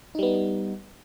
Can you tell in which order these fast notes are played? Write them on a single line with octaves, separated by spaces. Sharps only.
D#4 G3 B3